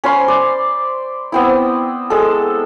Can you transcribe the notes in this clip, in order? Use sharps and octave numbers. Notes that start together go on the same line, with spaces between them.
C#4 C5 B5 C6
D5
B3 C4 E4
G#3 A4